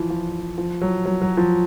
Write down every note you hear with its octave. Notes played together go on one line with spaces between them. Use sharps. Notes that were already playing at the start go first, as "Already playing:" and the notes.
Already playing: E3 F3
F3
F3
F#3
F#3
F#3
F3